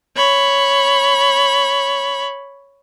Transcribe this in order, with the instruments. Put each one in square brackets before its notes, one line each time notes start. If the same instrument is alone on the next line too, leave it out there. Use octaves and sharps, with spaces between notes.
[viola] C#5 B5